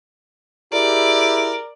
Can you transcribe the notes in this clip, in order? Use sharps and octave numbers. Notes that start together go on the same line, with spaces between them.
E4 G4 G#4 A#4 D5